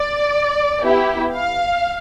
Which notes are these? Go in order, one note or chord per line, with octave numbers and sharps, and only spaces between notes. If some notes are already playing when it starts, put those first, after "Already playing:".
Already playing: D5
B3 E4 G4
F5